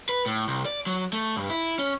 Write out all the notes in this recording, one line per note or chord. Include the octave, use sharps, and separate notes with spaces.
B4
A2
C2
D5
F#3
A3
G2
E4
C#4